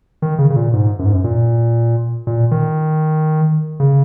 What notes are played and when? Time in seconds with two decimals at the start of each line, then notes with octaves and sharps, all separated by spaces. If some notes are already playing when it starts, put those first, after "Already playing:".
0.22 D#3
0.38 C#3
0.50 C#3
0.56 A#2
0.73 G#2
0.99 F#2
1.06 G#2
1.13 F#2
1.24 A#2
2.27 A#2
2.51 D#3
3.80 C#3